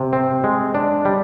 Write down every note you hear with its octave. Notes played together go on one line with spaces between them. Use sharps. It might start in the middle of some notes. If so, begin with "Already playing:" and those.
Already playing: C3
C4
G#3
D4
G3